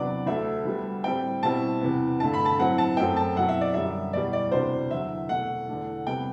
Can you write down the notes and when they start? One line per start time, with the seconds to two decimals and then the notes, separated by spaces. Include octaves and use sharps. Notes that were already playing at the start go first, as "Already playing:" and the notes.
Already playing: E2 C3 F#3 B3 D4 D5
0.26 D2 D3 A3 E5
0.65 D2 D3 G3 B3
1.04 A2 G3 C4 E4 G5
1.43 B2 G3 C4 E4 A5
1.81 E2 C3 E3 B3
2.20 G2 D3 A3 A5
2.34 B5
2.45 A5
2.58 A2 F#3 C4 E4 F#5
2.78 A5
2.97 F#2 F#3 A3 C4 G5
3.17 A5
3.36 B2 F#3 C4 E4 F#5
3.49 E5
3.61 D5
3.74 F#2 D3 G3 E5
4.13 E2 B2 G3 D5
4.33 D5
4.52 D2 C3 E3 B3 D4 C5
4.91 E2 D3 F#3 E5
5.29 C2 B2 A3 F#5
5.68 E2 D3 A3 D4
6.07 C3 G3 B3 G5